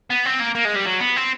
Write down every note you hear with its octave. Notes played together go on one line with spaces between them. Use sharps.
B3
C4
A#3
A#3
G#3
G3
F#3
B3
C4